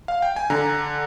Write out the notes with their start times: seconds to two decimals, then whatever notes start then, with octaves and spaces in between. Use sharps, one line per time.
0.08 F5
0.22 G5
0.36 G#5
0.50 D3 A#5